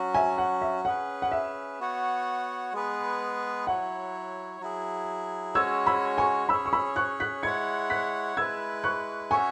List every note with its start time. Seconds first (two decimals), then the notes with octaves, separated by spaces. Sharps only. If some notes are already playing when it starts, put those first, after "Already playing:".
Already playing: F#3 C#4 F#4
0.14 E5 G#5
0.38 F#5
0.62 E5
0.85 C#4 G#4 B4 F#5
1.22 F#5
1.32 E5
1.80 B3 F#4 C#5 F#5
2.73 G#3 B3 G#4 B4
3.67 F#3 E4 C#5 F#5
4.61 F#3 E4 G#4
5.55 G#3 C#4 F#4 C#5 E6 G#6
5.86 B5 E6
6.18 G#5 C#6
6.49 C#4 G#4 C#5 B5 E6
6.66 C#6
6.73 B5 E6
6.96 C#6 F#6
7.20 F#6 B6
7.43 G#3 E4 C#5 F#5 G#6 C#7
7.90 F#6 B6
8.37 G#3 E4 B4 E6 G#6
8.84 C#6 F#6
9.31 C#4 F#4 C#5 E5 G#5 C#6